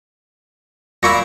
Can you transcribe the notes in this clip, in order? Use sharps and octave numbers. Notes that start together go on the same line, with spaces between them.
A#2 A#3 E4 B5 C#6 A#6